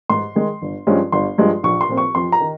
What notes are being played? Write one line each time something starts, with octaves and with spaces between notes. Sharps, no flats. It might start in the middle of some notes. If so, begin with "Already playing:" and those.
G#2 C6
D#3 G#3
G1
G2 F3 G#3 C#4
G1 C6
G2 F3 G#3
A#1 C#6
C6
A#2 F3 C4
C#6
F2 C6
A#5
D#3